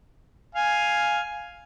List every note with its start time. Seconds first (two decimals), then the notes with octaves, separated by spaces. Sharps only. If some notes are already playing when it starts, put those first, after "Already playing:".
0.55 F5 G#5